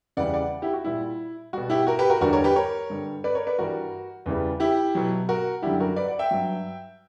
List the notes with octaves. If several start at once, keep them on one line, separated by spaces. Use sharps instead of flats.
E2 C#3 E3 G3 D5 F#5
D5 F#5
E4 G4
F#4
A#2 G3 E4
B2 G3 F#4
E4 G4
F#4 A#4
G4 B4
F#4 A#4
E2 D3 G3 F#4 A#4
A#4 C#5
G4 B4
A#4 C#5
G2 D3 G3
B4 D5
A#4 C#5
B4 D5
G2 E3 G3 F#4 A#4
E2 C#3 E3 G3
E4 G4
B2 F#3
F#4 A#4
F#2 D3 G3 E4 G4
F#4 A#4
B4 D5
D5 F#5
E5 G5
G2 F#3